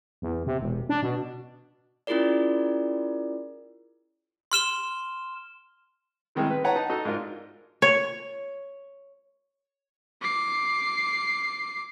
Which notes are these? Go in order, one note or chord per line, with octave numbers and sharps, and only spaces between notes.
E2
C3
E1
D4
B2
C#4 E4 F4 G#4 A#4 D5
C6 F6 E7 G7
A2 C3 D#3 G3 G#3
B4
B4 C#5 F#5 A5 A#5
D#4 A5
D#4 F#4 A4 D#5
G#2 D4 F4 A#4
C#5
D6 C7